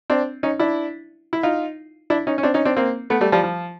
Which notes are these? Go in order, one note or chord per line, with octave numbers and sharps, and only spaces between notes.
C4 D4
C#4 D#4
D4 E4
E4
D#4 F4
D4 E4
C#4 D#4
C#4
C4 D4
C#4 D#4
C4 D4
A#3 C4
A3 B3
G3 A3
F3 G3
F3